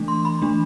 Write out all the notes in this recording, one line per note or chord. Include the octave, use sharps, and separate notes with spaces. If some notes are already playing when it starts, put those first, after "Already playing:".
Already playing: E3 A3 D4
C6
B5
E3 A3 D4